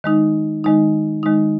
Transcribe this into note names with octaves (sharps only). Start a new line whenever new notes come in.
D#3 G#3 D#4
D#3 G#3 D#4
D#3 G#3 D#4